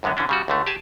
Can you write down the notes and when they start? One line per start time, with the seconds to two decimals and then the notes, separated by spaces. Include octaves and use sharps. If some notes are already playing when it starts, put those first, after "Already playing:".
0.03 C#2 F#2 D3 G#3 B3
0.17 D3 E3 C#4 D4
0.29 C#3 G3 F#4
0.48 C#2 D3 A3
0.66 G4 G#4 G#5 A5